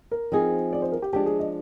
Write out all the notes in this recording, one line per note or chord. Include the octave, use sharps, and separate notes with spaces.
A#4
F3 C4 D#4 G#4
D5
C5
A#4
G4
F3 G#3 D4 G4
G#4
D#5